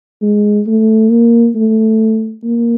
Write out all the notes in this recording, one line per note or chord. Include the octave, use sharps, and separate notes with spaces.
G#3
A3
A#3
A3
A#3